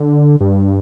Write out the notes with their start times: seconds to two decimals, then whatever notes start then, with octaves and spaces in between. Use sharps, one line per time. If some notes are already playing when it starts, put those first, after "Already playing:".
Already playing: D3
0.41 G2